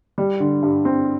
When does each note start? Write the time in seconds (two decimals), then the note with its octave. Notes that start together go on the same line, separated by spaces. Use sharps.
0.18 G3
0.40 D3
0.63 G2
0.85 C4